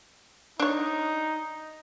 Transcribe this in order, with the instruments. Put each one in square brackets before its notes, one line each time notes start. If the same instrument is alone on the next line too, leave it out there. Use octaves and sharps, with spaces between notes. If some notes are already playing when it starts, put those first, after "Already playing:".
[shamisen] D4 C#5 [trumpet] D#4